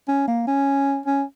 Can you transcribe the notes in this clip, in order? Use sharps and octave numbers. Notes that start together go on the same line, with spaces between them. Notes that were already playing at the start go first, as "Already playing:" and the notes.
C#4
A#3
C#4
C#4